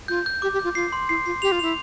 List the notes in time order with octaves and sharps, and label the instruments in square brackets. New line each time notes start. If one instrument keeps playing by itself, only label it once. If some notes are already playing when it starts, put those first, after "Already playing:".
[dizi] F4 [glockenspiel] G6
[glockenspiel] G6
[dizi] G4 [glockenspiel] D6
[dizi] G4
[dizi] F4 [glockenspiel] G6
[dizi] F4 [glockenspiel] C7
[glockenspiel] C6
[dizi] E4 [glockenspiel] C7
[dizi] F4 [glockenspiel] C7
[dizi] G4 [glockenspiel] F7
[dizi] F4
[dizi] E4 [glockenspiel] F7